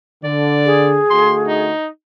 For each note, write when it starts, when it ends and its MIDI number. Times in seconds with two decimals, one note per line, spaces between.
0.24 1.01 50
0.24 0.90 74
0.65 1.65 68
1.10 1.72 50
1.10 1.72 57
1.10 1.72 66
1.10 1.33 84
1.48 1.87 63